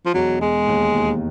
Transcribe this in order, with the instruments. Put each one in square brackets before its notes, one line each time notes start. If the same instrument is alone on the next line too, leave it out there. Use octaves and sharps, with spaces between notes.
[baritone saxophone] F3
[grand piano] E1 [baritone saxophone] F#3
[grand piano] E1 [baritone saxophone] G#3
[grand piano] D#2
D#2